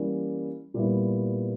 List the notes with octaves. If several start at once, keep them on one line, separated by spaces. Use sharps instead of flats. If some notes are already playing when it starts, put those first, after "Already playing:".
Already playing: E3 G3 A#3 C#4
A#2 G3 B3 E4